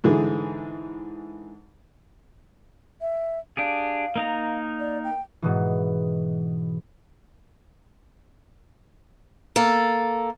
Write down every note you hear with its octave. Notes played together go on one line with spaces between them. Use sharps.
G#2 D3 E3 G#4
E5
D4 G4 G#4 F5
A#3 D#4 A#5
D5
G5
G#2 B2 E3
A#3 A4